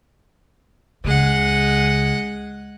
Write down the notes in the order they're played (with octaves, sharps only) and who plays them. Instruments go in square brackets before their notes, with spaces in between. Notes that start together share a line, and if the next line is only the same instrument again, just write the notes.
[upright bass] C#2 C#3 [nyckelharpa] G#3 F#5